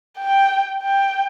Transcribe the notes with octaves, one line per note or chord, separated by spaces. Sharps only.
G5
G5